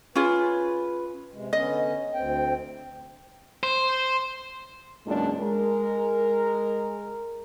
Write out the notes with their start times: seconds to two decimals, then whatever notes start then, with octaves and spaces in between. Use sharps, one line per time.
0.15 C#4 F4 G#4 B4
1.33 C3 G#3
1.53 D3 B3 C#4 D#5
2.14 D2 C4 G5
3.63 C5
5.06 E2 A#2 F#3 G#3 C#4 D4
5.41 G#3 A#4